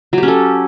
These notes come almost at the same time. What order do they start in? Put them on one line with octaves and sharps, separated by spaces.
F#3 G4 C#4 A4